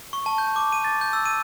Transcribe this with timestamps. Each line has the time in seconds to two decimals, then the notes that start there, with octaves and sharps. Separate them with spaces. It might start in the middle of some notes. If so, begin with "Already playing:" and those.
0.13 C#6
0.26 A5
0.38 G6
0.56 D6
0.72 D#7
0.84 A6
1.01 G6
1.13 E6
1.26 D#7